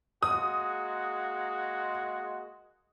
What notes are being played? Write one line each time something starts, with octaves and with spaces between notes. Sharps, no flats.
G#3 A#3 F#4 D#6